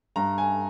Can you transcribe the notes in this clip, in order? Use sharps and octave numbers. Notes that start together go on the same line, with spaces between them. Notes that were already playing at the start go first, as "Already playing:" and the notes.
G2 A#5
G#5